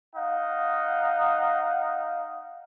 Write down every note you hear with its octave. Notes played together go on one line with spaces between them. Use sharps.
D#4 F5 F#5